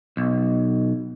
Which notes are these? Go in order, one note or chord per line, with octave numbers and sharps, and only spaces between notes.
B1